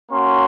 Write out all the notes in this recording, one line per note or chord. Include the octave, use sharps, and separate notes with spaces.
A#3 C#4 F#4 C6